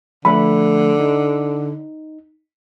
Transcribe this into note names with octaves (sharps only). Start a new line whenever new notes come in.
D3 F3 A3 B5
D#4